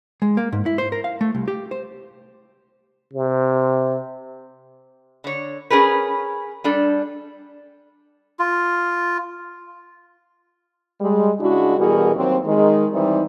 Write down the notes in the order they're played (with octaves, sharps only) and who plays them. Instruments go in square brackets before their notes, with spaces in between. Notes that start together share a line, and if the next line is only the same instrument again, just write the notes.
[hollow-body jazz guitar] G#3
A#3
G#2
E4
C5
A#4
F5
A3
C2
G4
C5
[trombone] C3
[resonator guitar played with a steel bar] D3 C#5
C#4 G#4 A#4 B4
G3 D4 A4
[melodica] F4
[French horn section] G3 G#3
C#3 G#3 D4 E4 F#4
B2 E3 G3 F#4 G#4 A#4
D#2 F#3 C4
D#3 G#3
E3 G3 C4 D#4